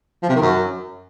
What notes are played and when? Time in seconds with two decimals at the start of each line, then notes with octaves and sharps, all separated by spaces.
0.23 F3
0.29 C3
0.36 D#3
0.42 F#2